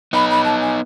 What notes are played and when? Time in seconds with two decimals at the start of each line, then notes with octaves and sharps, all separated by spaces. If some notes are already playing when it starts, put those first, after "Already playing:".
0.13 B3 D#4 B5
0.30 B5
0.45 A5
0.61 G#5